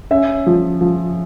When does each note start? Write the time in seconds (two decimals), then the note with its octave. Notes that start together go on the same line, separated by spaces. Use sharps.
0.11 C#4 E5
0.46 F3
0.81 F3